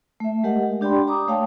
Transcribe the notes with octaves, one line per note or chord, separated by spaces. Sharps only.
A3 E5
G#3 G4 A#4 D#5 F#5
D4 G4 D5 G5 B5 C6
A#5 D6 D#6
A3 C#5 F5 G5 A5